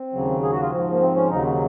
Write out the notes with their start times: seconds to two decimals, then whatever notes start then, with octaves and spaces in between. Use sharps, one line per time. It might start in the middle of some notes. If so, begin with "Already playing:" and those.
Already playing: C4
0.13 D#2 C#3 F#3
0.42 G#4
0.52 F#4
0.62 F4
0.71 G#2 F3 C4
0.91 A#3
1.01 C4
1.15 C#4
1.30 D#2 C#3 F#3 D#4